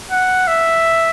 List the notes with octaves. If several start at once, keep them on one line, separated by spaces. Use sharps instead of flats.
F#5
E5